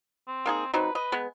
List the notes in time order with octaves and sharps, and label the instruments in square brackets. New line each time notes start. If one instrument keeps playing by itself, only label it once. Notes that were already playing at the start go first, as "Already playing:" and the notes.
[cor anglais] C4
[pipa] A#3 D#4 G#4
[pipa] F#3 C4 D#4 [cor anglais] B4
[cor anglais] B4 [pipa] D#5
[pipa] G#3 B3